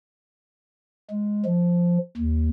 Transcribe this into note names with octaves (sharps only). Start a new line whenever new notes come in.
G#3
F3
D#2